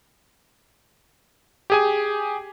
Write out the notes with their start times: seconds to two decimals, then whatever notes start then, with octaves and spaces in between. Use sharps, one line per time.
1.70 G4 G#4 G#5